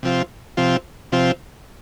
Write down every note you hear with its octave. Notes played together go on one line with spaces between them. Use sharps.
C3 F3 C4 F4
C3 F3 C4 F4
C3 F3 C4 F4